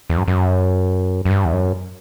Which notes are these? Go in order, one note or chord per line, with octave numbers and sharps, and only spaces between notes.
E2
F#2
F#2
F#2
G2
E2
F#2